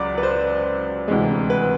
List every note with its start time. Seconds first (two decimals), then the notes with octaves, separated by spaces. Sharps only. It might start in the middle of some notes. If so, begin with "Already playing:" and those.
Already playing: C#2 F#3 D5
0.18 B4
0.23 C5
1.08 D2 C3 E3 G#3
1.50 B4